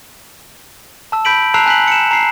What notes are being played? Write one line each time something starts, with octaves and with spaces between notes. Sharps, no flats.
A5 E6
B5 G6 B6 D7 F#7
A5 A#5 E6 F#6 C7 F7
G#5 F#6 B6 F#7
C#7 E7
A#5 C7